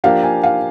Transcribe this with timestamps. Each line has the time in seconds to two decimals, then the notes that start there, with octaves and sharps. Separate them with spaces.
0.04 F3 A#3 D4 G4 F5
0.23 G#5
0.43 F5